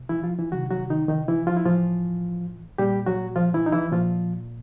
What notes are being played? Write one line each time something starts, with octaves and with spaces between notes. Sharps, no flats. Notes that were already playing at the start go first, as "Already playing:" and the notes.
Already playing: B2
E3 E4
F3 F4
E3 E4
C3 D#3 F#3 F#4
F#3 F#4
D#3 D#4
D#3 D#4
E3 E4
F3 F4
E4
A2 E3 F3 F4
A#2 G3 G4
F#3 F#4
F3 F4
E3 E4
D#4
E3 E4
A#2 F3 F4